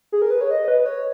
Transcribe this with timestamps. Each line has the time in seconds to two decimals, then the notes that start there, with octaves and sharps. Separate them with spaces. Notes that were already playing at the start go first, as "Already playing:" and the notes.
0.12 G#4
0.22 A#4
0.30 B4
0.41 C#5
0.51 D#5
0.68 B4
0.86 C#5